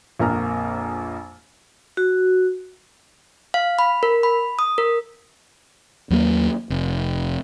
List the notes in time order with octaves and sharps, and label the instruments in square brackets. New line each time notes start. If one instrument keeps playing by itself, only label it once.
[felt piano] A#1 F2 A#3 A#5 F6
[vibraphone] F#4
[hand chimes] F5
B5
A#4
B5
D#6
A#4
[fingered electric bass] D#2 F#3 G#3 A#3
F1